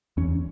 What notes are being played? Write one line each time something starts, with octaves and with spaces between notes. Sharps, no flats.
E2 C#4